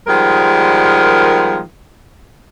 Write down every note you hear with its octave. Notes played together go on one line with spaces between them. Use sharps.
D#3 F3 G3 G#3 B3 A#4